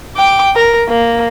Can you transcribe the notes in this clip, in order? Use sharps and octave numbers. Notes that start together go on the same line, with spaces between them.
G5 D6
A#4
A#3